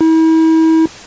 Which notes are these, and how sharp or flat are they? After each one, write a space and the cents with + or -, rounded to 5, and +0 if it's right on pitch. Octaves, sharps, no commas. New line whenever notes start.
E4 -40